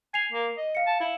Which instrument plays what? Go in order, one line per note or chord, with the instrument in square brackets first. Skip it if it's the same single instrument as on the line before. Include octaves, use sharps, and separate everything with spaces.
[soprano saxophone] G#5 [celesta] C7 F7
[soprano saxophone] A#3
D#5
[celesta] F5 C#7
[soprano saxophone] A5
E4